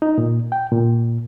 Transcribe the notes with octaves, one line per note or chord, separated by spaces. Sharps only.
D#4
A#2
G5
A#2